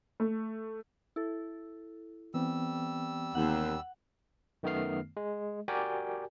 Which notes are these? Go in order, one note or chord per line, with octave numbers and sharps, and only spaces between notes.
A3
E4 A4
E3 G3 B3 C4 E6
D#2 F#5
F#2 D#3 A3 B3 F6 C7
G#3
F#4 G4 A#4 D5 G5 G#5